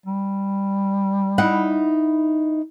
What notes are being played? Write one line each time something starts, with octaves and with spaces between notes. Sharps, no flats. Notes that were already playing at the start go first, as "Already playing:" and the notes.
G3
D#4 E4 F#5